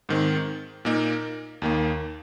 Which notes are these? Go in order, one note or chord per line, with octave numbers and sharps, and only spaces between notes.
G#2 D#3 C4
A#2 A#3 D#4 A#4
D#2 D#3 A#3